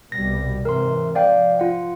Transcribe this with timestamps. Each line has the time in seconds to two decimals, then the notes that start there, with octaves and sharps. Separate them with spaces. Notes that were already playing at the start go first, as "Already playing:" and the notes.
0.12 C2 B2 G3 A#6
0.65 G#2 C3 E3 A#4 C6
1.15 F3 D5 F5 G5
1.59 F4 F#5